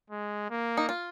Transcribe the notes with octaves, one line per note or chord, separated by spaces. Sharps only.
G#3
A#3
D#4
F4